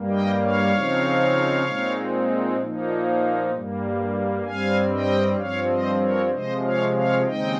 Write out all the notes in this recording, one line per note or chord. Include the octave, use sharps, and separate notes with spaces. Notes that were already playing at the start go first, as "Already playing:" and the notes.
Already playing: G2 G3 A#3
D#5 G5
C#5 F5
C#3 F3 C4 D#4
A#2 G#3 C4 D#4
A#2 F3 A#3 D#4
G2 G3 A#3
G2 G3 C4 F5 G#5
D#5 G5
G2 F3 C4 C#5 F5
C5 D#5
A#4 C#5
C3 F3 G#3 C5 D#5
C#5 F5
C#5 F5
D#2 C#3 G#3 C4 D#4 D#5 G5